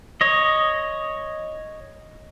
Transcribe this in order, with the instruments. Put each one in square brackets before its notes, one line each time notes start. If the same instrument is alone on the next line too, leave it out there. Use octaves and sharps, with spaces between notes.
[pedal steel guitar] C#5 D#5